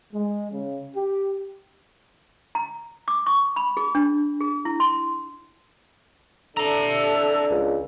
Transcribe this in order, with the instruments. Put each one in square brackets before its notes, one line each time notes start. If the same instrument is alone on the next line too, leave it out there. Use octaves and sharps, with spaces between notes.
[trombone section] G#3
C#3
G4
[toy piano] A#5
D6
C#6
B5
G#4
D4
G#4
E4
C6
[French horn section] E3 C4 D4 [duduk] A4 [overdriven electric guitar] E5 A#5
[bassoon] C#2